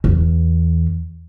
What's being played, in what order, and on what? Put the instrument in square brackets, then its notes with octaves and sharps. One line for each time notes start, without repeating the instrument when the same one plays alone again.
[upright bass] E2